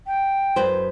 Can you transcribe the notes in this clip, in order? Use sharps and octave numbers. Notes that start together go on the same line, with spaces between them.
G5
F#2 B4 C5